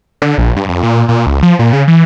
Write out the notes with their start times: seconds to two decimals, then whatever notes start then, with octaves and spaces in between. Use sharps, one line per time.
0.22 D3
0.38 A#1
0.56 G2
0.69 F2
0.83 A#2
1.08 A#2
1.26 C#2
1.43 F3
1.59 A#2
1.73 C#3
1.88 E3